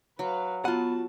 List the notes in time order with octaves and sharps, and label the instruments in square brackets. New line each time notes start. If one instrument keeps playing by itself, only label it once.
[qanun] F#3 [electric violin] B4 F5
[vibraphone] B3 [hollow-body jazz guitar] F4 F#5 [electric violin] F#4 A5